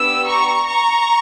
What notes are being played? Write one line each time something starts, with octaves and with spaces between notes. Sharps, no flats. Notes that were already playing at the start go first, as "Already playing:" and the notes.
Already playing: B3 D4 G4 E6
A#5 C#6
A#5 C#6